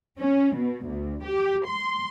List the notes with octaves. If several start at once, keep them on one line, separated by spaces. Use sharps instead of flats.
C#4
B2
D2
G4
C6